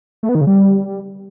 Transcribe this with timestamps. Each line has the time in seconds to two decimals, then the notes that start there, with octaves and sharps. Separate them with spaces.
0.23 A3
0.29 B3
0.35 D#3
0.41 C#3
0.47 G3